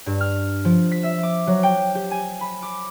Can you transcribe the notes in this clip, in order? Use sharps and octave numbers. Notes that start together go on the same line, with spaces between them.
G2
F6
F3
B6
E5
D6
F#3
G5
G4
G#5
B5
D6